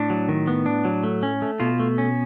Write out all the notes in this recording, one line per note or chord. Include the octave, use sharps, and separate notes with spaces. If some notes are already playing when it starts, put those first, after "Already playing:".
Already playing: A2 D4
F#3
D#3
B3
D4
F#3
A3
C#4
A3
B2 F4
A3
C#4